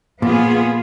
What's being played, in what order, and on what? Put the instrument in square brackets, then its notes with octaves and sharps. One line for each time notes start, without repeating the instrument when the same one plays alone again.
[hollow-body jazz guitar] A#2 [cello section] F3 B3 F4 G#4